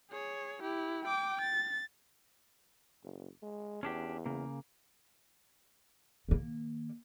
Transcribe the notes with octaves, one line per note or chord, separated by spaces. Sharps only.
G#4 C#5
E4 G4
G5 D6
A6
F#1
G#3
E2 C#4 D4 G4
C#3 A#3
D#3 A#3